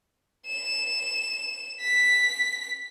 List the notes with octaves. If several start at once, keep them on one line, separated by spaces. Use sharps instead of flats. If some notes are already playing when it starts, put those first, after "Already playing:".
E7
B6